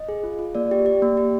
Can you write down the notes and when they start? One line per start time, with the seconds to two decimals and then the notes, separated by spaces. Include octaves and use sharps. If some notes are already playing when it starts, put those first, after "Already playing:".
Already playing: D#5
0.09 G#4
0.23 F4
0.39 F4
0.55 A#3 D5
0.71 G4
0.86 G4
1.02 A#3
1.17 G4